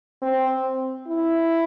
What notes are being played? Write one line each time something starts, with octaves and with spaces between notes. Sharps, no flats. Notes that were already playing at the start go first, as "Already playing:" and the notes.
C4
E4